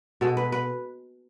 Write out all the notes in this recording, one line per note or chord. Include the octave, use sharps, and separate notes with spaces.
B2 G#3 A4
B4
B4